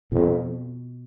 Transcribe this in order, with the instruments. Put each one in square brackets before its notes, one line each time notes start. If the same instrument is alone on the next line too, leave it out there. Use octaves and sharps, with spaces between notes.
[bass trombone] F2 [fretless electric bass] B2